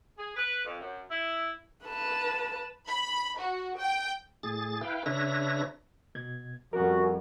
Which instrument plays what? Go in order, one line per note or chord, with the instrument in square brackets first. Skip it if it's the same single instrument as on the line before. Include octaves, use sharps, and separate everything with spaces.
[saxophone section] G#4
B4
F2
F#2
E4
[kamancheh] B4 A5
[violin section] B5
F#4
G5
[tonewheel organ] A2 G#4 A6
E4 B4 F5 G5
C#3 D4 B4 C#5 E5 A#6
[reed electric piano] B2 G#6
[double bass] F2 G3 [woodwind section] C#4 F#4 [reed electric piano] A#4 F#5